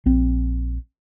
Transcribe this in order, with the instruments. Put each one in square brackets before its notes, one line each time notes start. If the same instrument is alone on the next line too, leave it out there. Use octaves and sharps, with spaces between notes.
[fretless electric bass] A#1 C4